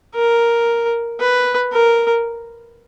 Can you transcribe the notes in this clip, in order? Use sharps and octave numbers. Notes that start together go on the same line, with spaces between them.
A#4
B4
A#4